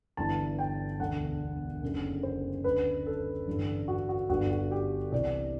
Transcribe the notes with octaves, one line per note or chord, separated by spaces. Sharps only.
G1 G2 E3 A5
G5
E1 D2 D3 F#5
F#1 F#2 D3
C5
D2 D3 B4
A4
A1 G2 D3
F#4
F#4
G1 G2 D3 F#4
F#4
G4
C2 C3 E3 D5